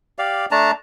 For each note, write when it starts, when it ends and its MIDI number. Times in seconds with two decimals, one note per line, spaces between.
0.19 0.46 67
0.19 0.46 74
0.19 0.46 77
0.51 0.71 57
0.51 0.71 62
0.51 0.71 81
0.51 0.71 82